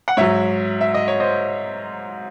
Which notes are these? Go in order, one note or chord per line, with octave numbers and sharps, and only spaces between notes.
F#5
G#2 F#3 C#5 E5
E5
D#5
C#5
C5 D#5